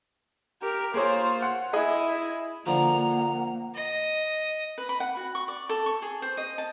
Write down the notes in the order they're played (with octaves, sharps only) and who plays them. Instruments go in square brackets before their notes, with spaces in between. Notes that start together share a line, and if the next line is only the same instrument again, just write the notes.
[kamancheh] G4 A#4
[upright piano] A#3 G#4 C#5 [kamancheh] F4 C5
[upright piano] F#5
[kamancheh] E4 [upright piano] G#4 D#5
[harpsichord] D3 F3 [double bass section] A#3 [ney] F#5 [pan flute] A#5
[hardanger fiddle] D#5
[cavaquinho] B4
B5
F#5
F#4
C#6
D5
A4
C#6
G#4
C5
D#5
A5